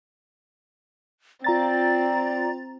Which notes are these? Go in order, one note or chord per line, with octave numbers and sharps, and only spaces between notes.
C4 F4 D5 A#5 A6